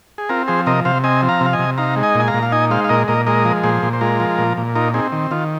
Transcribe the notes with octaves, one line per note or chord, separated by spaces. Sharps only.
G#4
C4 F4 A#4
F3 G#4 C5
C3 A#4 D#5
C3 C5 F5
C4 D#5 G#5
F3
F5 A#5
C3
F5
D#5 G#5
C3
D#4 F5 A#5
G#3
D#5 G#5
A#2
G#5
F5 A#5
A#2
F5
D#4 D#5 G#5
G#3 C5 F5
F5
A#2 A#4 D#5
A#2 A#4 D#5
G#3 A#4 D#5
F3
A#2 G#4 C5
A#2
C5
G#3 F4 A#4
F3
A#2
A#2
D#4 F4 A#4
C4 D#4 G#4
D#3
D#3 F4